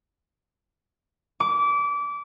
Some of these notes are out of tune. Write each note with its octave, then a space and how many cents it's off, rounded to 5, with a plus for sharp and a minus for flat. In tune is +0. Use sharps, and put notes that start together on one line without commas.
D6 -25